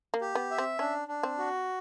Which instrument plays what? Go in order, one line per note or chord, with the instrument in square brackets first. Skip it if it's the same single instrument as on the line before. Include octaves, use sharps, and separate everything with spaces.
[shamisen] A#3
[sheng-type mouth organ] G4
[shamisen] B3
[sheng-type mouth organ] E5
[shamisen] C4
[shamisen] C#4 [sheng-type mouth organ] D4
[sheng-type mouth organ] D4
[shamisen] C4
[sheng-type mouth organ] F#4